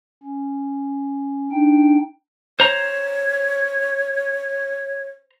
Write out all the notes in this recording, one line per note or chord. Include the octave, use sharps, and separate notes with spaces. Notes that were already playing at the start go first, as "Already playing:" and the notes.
C#4
D4 D#4 G5
C5 C#5 A#5